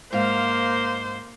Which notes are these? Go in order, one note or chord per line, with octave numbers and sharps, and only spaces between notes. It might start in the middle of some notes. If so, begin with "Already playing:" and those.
G#2 A#3 C5 F5